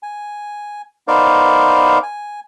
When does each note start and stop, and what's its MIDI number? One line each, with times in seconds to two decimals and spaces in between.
0.03 0.82 80
1.08 1.98 59
1.08 1.98 63
1.08 1.98 70
1.08 1.98 72
1.08 1.98 74
1.08 1.98 77
2.03 2.40 80